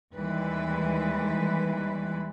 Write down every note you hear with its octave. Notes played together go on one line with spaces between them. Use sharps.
D#2 E3 G3 G#3 B4